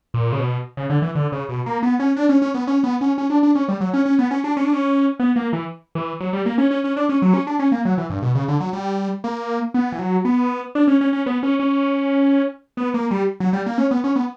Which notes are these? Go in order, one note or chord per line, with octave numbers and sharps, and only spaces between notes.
A#2
C#3
B2
C#3
D3
E3
D3
C#3
B2
A#3
B3
C#4
D4
C#4
C#4
B3
C#4
B3
C#4
C#4
D4
D4
C#4
G3
F#3
C#4
C#4
B3
C#4
D4
C#4
D4
C#4
B3
A#3
E3
E3
F#3
G3
A#3
C#4
C#4
C#4
D4
C#4
F#3
C#4
D4
C#4
A#3
F#3
E3
G2
B2
C#3
D3
F#3
G3
A#3
B3
E3
F#3
B3
D4
C#4
C#4
C#4
B3
C#4
C#4
B3
A#3
G3
F#3
G3
A#3
C#4
B3
C#4
B3